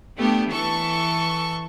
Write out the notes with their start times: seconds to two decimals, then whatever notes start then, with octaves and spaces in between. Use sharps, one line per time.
0.17 A3 B3 D4 G4
0.49 E3 A4 C#6